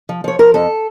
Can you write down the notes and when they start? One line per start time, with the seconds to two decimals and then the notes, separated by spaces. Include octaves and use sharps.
0.09 F3
0.24 F3 C#5
0.39 F3 A#4
0.54 F2 A4